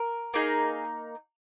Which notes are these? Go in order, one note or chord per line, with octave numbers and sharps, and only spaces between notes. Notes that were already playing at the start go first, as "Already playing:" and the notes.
Already playing: A#4
A#3 D#4 G#4